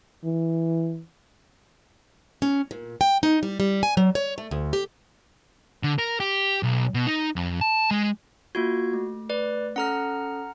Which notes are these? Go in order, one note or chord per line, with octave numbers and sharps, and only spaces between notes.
E3
C#4
A#2
G5
D#4
G3
G3
G#5
F#3
C#5
A3
D2
G4
D3
A#4
G4
B1
B2
D#4
F2
A5
G#3
A#3 F4 F#4 G#6
A3
B4 D5
C#4 A4 F#5 A#5 F6